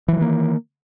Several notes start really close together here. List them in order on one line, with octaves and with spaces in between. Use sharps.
E3 F#3 D#3 A#3